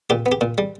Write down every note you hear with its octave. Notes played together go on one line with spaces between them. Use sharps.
A#2 G4
B3
G4
A#2
G3